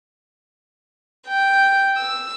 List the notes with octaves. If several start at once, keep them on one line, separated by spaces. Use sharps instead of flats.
G5
E6